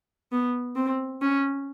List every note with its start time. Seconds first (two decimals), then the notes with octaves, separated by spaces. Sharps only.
0.32 B3
0.76 C4
1.22 C#4